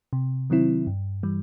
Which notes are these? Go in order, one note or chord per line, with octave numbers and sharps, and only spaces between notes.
C3
D#3 F#3 C4 E4
G2
E3 G3